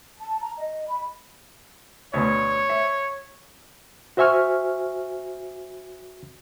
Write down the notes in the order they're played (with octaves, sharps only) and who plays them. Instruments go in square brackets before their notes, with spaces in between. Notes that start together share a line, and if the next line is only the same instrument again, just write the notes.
[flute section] A5
A#5
D#5
B5
[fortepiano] D2 B2 [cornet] C#5
[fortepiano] E5
[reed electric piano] F#4 C5 E5 G#5 C#6 F6